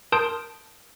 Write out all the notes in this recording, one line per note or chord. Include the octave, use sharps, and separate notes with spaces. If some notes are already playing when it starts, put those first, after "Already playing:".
A#4 A5 C6 D#6 G6 D7